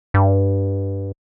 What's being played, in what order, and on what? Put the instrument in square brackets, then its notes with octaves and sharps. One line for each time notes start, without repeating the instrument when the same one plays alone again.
[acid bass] G2